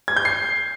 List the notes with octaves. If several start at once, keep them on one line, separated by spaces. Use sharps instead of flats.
G#6
G6
C7